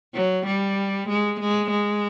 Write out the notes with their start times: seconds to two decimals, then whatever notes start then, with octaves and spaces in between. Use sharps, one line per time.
0.14 F#3
0.46 G3
1.09 G#3
1.40 G#3
1.70 G#3